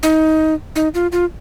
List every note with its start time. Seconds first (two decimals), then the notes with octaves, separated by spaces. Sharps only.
0.03 D#4
0.76 D#4
0.94 F4
1.12 F4